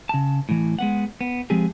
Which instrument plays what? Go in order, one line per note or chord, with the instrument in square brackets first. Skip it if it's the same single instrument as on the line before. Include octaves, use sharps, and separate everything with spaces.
[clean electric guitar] C#3 A5
A2 E3
G#3 B3 F#5
B3
F3 G#3 C4 G4 G#4